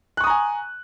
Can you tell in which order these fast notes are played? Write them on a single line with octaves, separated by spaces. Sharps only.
F#6 C#6 D#6 A#5 G#5